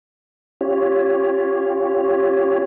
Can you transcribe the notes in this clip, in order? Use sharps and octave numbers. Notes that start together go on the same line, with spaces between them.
C#4 F4 G4 C#5